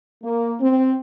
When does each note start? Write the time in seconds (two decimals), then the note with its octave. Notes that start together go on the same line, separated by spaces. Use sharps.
0.24 A#3
0.61 C4